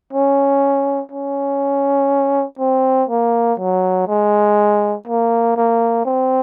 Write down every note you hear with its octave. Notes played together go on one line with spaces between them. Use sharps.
C#4
C#4
C4
A#3
F#3
G#3
A#3
A#3
C4